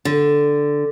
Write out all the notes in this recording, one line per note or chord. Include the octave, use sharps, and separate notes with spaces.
D3